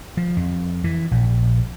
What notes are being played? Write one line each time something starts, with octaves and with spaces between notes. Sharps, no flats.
F3
F2
E3
A#1